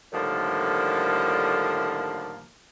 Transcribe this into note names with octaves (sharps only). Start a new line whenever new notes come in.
A2 D3 D#3 F3 G3 A#3